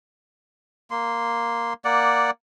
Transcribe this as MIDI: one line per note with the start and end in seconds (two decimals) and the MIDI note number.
0.91 1.73 58
0.91 1.73 84
1.85 2.31 58
1.85 2.31 74
1.85 2.31 78